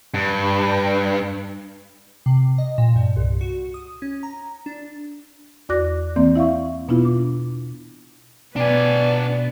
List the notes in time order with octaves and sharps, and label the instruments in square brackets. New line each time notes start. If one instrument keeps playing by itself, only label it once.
[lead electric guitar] G2
[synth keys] C3
D#5
A#2
G2
C2
F#4
D#6
C#4
A#5
D4
[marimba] E2 F#4 D5 D6 F#6 A#6
E3 A#3 C4 D5
E4 E5 F5 C#6
B2 B3 D4 E4 F4
D6
[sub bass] B2 [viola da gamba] B3 [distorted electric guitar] D4 G#5 [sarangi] D5